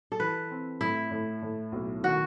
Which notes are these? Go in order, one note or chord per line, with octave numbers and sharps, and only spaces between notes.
A4
E3 B4
C4
A2 E4
A2
A2
B1
D#3 F#4